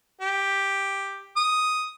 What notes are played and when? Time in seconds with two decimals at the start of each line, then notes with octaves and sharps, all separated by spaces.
0.21 G4
1.37 D#6